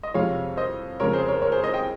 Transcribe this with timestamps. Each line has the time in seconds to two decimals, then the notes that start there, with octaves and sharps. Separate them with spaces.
0.03 D#5
0.14 F2 C3 F3 G#3 C#5 F5
0.57 C5 D#5
1.00 F2 C#3 G#3 A#4 C#5
1.13 G#4 C5
1.28 A#4 C#5
1.42 A#4 C#5
1.52 G#4 C5
1.63 C5 D#5
1.74 D#5 G5